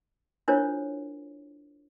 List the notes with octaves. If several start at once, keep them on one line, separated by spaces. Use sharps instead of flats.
D4 E4 F4 A#4 C5 C#5